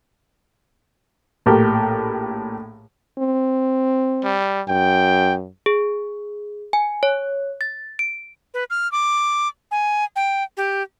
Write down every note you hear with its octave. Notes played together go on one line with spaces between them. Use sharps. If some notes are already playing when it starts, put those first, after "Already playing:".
A#1 A2 G4 A#4
C4
G3
F#2 G5
G#4
G#5
C#5
A6
D7
B4
F6
D6
G#5
G5
G4